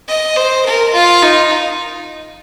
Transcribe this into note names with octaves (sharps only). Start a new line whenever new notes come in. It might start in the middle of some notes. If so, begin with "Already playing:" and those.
D#5
C5
A#4
F4
D#4